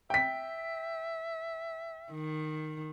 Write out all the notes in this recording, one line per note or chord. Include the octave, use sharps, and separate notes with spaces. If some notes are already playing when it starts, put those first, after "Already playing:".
E5 G5 B6
D#3